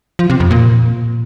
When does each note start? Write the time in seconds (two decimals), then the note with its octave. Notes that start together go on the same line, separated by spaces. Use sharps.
0.19 F3
0.30 C3
0.40 F2
0.51 A#2